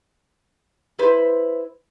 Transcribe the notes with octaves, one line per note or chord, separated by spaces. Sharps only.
E4 B4 C5